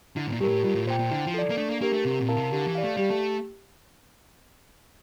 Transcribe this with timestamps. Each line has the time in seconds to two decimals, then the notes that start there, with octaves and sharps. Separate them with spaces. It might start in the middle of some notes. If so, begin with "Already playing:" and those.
0.16 D3 E4
0.27 A2
0.32 A#2
0.41 G2 G4
0.44 A2 A#4
0.64 G2 F4
0.75 A2
0.87 A#2 C5 G5
0.99 A#2
1.11 D3 E4
1.26 F3
1.34 A4 D5
1.50 A#3
1.58 A3 D4
1.69 A#3
1.81 A#3 G4 A#4
1.93 A3
2.05 C3 C4
2.21 A#2
2.29 E4 A#4 F5 A5
2.37 C3
2.52 D3 G4
2.67 E3
2.75 D5 F5
2.83 A3
2.97 G3 G4
3.10 A3